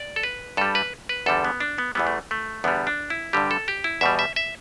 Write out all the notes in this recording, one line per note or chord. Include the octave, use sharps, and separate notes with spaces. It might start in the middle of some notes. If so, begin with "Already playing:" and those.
Already playing: D5
A4
B4
G2 G3 A4
B4
B4
E2 D3 G3 A4
B3
D4
B3
E2 E3 G3 B3
A3
A3
E2 D3 G3 B3
D4
E4
G2 D3 G3 G4
A4
G4
E4
E2 B2 G3 E5
E5
E5